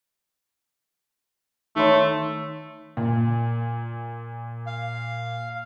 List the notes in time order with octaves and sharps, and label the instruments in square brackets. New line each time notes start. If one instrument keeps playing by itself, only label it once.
[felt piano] D#3 C#5 C6 [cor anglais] A3
[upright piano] A#2
[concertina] F5